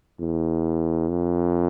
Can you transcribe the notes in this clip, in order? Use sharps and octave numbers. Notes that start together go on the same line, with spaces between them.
E2
F2